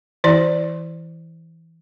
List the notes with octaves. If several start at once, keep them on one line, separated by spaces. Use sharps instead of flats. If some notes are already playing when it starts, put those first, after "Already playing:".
E3 E4 D5